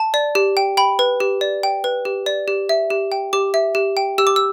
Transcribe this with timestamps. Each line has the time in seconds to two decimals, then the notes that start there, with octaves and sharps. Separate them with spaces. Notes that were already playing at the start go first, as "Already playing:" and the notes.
Already playing: A5
0.14 D5
0.35 G4
0.57 G5
0.77 G5 B5
0.99 B4
1.20 G4
1.41 D5
1.63 G5
1.84 B4
2.05 G4
2.26 D5
2.48 G4
2.69 E5
2.90 G4
3.12 G5
3.33 G4 D6
3.54 E5
3.75 G4
3.97 G5
4.18 G4 E6
4.27 D6
4.36 E6